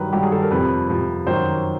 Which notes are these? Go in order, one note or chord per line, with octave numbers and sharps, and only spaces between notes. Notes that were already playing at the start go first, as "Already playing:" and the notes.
Already playing: G2 D#3 F#3 B4
G2 D#3 F#3 G4
G#4
A4
A#4
F2 C3 F3 B4
F2 C3 F3
F#2 D#3 F#3 C5